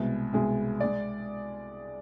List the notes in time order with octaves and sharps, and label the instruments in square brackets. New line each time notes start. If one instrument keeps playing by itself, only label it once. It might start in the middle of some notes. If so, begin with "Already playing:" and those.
Already playing: [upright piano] C2 B2 G#3
C2 B2 G#3 G#4
G#3 D5